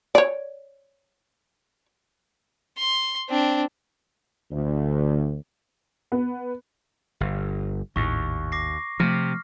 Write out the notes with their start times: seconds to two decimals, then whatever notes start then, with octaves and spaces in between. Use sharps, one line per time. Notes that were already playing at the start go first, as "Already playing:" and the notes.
0.15 C#5 D5
2.78 C6
3.29 C4 D4
4.52 D2
6.12 B3
7.20 G1
7.96 G#1 D#2 A2 C#6
8.52 D6 A#6 C7
9.00 C3 F3 A3 F6